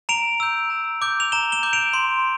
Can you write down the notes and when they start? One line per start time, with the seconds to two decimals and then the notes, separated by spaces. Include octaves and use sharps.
0.09 A#5 D7 F7
0.40 E6 G6
0.70 A#5
1.02 D6 G6
1.20 F7
1.32 A#5 E7 G7
1.52 E7 G7
1.63 D6 G6
1.73 D7 F7
1.94 C6